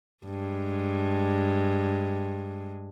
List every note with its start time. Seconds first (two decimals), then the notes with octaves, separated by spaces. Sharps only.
0.25 G2 G#3